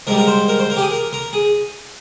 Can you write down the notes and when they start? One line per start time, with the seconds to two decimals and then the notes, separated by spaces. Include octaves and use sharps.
0.07 G#2 A#4
0.11 G3
0.18 A#4
0.27 C5
0.48 A#4
0.59 C5
0.70 A#4
0.76 G4
0.81 G#4
0.91 A#4
1.13 A#4
1.33 G#4